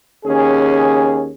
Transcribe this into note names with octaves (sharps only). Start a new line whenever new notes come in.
D#2 C#4 G#4